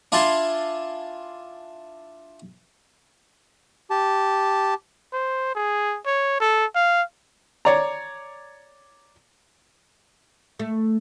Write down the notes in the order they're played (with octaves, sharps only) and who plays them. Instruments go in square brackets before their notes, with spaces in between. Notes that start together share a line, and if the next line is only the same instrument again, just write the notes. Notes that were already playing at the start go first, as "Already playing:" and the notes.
[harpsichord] D4 E4 F4 G#5 A5 C6
[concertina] G4 A5
[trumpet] C5
G#4
C#5
A4
F5
[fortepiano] C#5 D5 A#5
[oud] A3